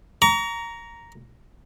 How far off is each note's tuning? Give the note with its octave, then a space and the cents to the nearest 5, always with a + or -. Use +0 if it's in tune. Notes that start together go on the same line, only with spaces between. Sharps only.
A#5 +0 C#6 +40